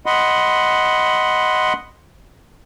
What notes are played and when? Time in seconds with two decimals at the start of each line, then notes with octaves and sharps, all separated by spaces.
0.06 D#5 F#5 B5 C6